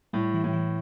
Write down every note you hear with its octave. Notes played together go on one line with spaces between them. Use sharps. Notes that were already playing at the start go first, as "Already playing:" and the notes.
A2 G3
E3
A2
E3